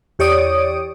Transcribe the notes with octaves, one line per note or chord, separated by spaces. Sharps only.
E2 G4 C#5 D5 D#6 D7